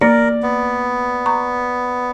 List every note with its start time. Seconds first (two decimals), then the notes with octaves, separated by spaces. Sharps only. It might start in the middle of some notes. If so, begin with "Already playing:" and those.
0.01 A#3 A#4 D5 A#6
0.43 B3
1.26 A#5 C#6